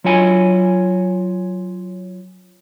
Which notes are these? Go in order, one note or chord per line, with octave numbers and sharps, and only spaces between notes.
F#3 F4 C#5 G#5